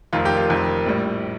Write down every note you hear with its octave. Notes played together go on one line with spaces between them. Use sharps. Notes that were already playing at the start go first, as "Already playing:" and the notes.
F1 F2 D#3 F4
G4
F4
F1 F2 D#3
A#1 A2 G3